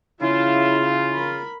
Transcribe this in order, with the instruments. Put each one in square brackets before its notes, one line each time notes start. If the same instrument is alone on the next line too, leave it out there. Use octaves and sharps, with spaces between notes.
[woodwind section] C#3 F4 [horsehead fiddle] E4 E5
[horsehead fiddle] A#4 B5